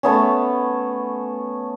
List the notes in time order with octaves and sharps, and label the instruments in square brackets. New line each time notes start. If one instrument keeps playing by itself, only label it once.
[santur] A3 B3 C#4